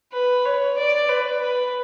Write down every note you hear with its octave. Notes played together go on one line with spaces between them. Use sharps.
B4
C#5
D5
B4
B4